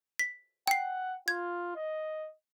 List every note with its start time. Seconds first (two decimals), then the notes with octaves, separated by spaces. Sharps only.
0.19 B6
0.67 F#5 G5 C7
1.28 F4 G#6
1.76 D#5